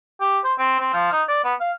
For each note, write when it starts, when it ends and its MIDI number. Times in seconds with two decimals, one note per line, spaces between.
0.21 0.39 67
0.44 0.54 72
0.59 0.76 60
0.80 0.93 60
0.94 1.10 53
1.12 1.23 63
1.28 1.44 74
1.44 1.54 59
1.60 1.71 77